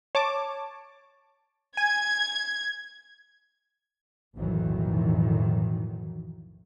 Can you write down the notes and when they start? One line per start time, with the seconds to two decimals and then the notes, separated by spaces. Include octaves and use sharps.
0.15 C#5 A5 D6
1.77 G#5 G#6
4.36 B1 F2 A2 D#3 E3 F#3